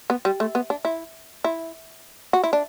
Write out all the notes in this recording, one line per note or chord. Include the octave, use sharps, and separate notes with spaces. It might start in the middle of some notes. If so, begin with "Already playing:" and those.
B3
G3
A3
B3
D4
E4
E4
F#4
E4
D4